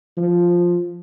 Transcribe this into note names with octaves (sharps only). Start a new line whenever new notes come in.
F3